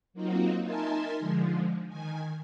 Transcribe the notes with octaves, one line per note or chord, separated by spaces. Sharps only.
F#3 A#3 C4 D#4 F4 F#4
D#4 A#4 E5 G#5 A5 C6
D3 F3 G#3
D#3 G#5